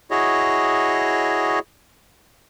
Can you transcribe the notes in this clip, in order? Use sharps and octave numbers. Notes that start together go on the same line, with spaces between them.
E4 F#4 G#4 C#5 D#5